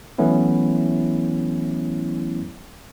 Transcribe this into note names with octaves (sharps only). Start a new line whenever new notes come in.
E3 F#3 A3 B3 C#4 E4